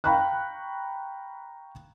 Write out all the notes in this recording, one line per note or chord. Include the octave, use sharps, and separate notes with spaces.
F5 G5 A#5 B5 C#6 F#6